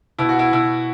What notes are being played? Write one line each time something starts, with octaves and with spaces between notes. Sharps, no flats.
B2 E4
F#4
E4
B2 E4